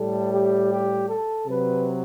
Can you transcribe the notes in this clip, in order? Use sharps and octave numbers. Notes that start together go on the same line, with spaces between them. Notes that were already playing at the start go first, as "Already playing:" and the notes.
Already playing: A2 G3 A4
G4
G4
A4
C3 F#3 B4